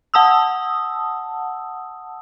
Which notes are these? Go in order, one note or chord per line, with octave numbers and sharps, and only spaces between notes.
F#5 A5 D#6 E6